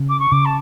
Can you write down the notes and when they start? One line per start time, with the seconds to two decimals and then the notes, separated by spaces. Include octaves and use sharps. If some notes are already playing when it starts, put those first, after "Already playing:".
Already playing: C#3
0.09 D6
0.19 C#6
0.32 C#3 D6
0.45 A5